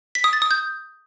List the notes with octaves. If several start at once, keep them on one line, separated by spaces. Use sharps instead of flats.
B6
D#6
A6
D#6
G6